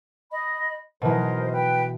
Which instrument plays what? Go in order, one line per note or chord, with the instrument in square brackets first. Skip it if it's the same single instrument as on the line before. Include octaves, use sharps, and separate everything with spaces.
[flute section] D#5 B5
[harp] B2 E3 [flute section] A#4 C5 D#5
[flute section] B4 G5